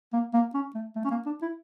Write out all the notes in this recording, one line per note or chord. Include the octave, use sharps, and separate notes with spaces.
A#3
A#3
C#4
A3
A3
C#4
A#3
D4
E4